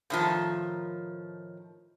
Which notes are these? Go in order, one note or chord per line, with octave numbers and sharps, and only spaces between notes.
A2 D#3 F3